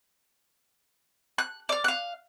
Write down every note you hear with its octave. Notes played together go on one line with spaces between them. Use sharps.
F#6
D5 F6
F5 F#6